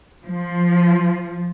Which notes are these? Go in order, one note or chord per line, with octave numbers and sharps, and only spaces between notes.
F3